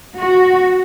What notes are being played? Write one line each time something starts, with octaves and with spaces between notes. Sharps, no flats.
F#4